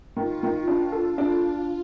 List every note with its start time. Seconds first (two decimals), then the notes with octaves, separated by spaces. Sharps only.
0.16 D#3 F4
0.43 D#3
0.68 D4
0.92 A4
1.18 D4